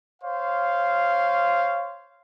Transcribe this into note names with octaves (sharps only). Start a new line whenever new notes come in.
C5 C#5 F5